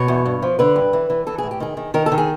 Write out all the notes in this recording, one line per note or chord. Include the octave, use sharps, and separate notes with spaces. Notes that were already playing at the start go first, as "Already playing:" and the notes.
Already playing: B2 C#5
E2
G2
F3
D3 B4
G2
E3
E3
E3 A4
A2 G#4
G4
D#3 G#4
D#3
D#3 A#4
A4
D#3
G#4